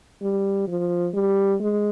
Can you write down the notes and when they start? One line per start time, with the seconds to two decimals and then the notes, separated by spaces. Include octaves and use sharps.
0.22 G3
0.68 F3
1.14 G3
1.60 G#3